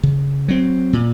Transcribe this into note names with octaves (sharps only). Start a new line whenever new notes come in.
C#3
F#3 C4
A#2